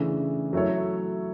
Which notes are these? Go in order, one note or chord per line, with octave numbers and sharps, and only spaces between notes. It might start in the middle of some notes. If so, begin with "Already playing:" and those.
Already playing: C#3 E3 A3 D4
F#3 A3 E4 A4 C#5